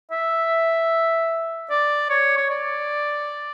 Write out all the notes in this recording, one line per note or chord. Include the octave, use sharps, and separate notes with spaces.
E5
D5
C#5
C#5
D5